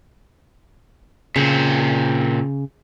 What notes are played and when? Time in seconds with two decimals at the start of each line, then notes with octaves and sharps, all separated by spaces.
1.36 A#2 C#3 C4